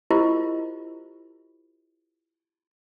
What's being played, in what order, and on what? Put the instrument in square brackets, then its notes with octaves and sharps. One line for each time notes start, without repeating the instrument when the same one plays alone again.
[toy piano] E4 F4 G4 A#4 C5 D#5